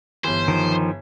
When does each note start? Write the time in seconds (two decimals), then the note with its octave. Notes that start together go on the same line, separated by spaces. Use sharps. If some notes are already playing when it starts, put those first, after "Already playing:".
0.24 G1 E3 C5
0.48 D#3 F3